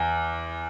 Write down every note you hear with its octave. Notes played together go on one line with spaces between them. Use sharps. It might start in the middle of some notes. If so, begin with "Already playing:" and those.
Already playing: E2